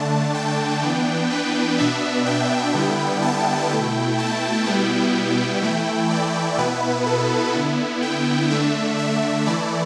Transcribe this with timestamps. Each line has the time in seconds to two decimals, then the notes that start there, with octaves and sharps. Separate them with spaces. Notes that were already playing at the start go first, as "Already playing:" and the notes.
Already playing: D3 A3 D4 A5
0.34 G5
0.82 E3 B3 D4
1.30 B4
1.78 B2 B3 D4 E5
2.26 G5
2.74 D3 G3 B3 E4
3.22 A5
3.70 B2 A3 E4 G5
4.18 A5
4.66 B2 G3 B3 E4 G5
5.62 E3 A3 E4
6.10 D5
6.58 B2 B3 E4 B4
7.06 A4
7.55 D3 B3 E4
8.02 G5
8.50 D3 A3 D4 E5
8.99 E5
9.46 E3 A3 E4 D5